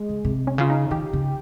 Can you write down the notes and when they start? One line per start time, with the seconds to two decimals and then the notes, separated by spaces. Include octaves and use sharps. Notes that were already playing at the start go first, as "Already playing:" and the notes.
Already playing: G#3
0.09 C#3
0.25 C3
0.47 C#4
0.58 C#3 F4
0.70 D#4
0.91 D#3 G4
1.13 C#3